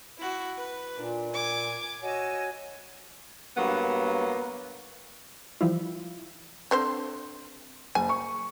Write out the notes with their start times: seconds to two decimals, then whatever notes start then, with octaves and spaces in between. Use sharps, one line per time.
0.19 E4 F#4
0.58 B4
0.97 A#2 D4
1.32 G#5 D6 G#6
2.03 F#4 C#5 D#5 G#5 E6
3.57 G2 F#3 A#3 B3
5.61 E3 F3 G3 E4 F4
6.71 D3 C4 C5
7.95 F#1 G#5
8.09 C#6